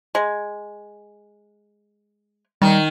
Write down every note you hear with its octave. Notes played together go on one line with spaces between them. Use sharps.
G#3
D#3 G3